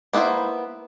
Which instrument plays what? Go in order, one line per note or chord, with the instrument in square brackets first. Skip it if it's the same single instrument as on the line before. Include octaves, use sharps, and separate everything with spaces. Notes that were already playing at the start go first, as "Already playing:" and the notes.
[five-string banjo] A#3 B3 E4 G#4 C5